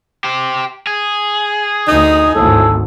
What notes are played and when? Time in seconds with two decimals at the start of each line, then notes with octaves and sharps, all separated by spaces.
0.24 G4 C5
0.87 G#4
1.88 D2 D#4
2.35 G#1 D2 A2 A4